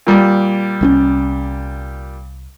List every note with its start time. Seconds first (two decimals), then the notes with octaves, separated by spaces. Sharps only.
0.07 A#2 G3
0.81 C2 C4 C#4